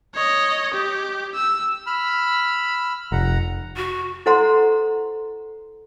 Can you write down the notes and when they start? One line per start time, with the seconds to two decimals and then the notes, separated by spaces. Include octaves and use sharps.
0.14 C#5 D#5
0.73 G4
1.35 E6
1.86 B5 E6 F6
3.12 F1 F#5 A#5
3.77 F#4
4.26 E4 A4 C5 F#5 A#5 C6